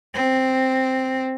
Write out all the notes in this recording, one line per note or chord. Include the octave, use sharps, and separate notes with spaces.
C4